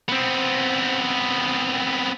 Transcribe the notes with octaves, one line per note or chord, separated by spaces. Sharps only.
B3 C4